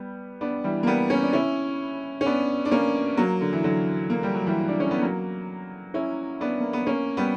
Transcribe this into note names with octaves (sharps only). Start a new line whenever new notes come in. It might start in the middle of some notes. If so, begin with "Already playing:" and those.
Already playing: G3 B3
B3 D4
E3 G3
A#3
G3 B3
A#3 C#4
D4
C#4 E4
C#4
B3 D4
D4
A#3 C#4
F#3 A#3
D3
E3
D3 F#3
A#3
G3
F#3
E3 G3
D4
C#4
B3
F#3 A#3
C#4 E4
B3 D4
A#3
B3
A#3 C#4
G3 B3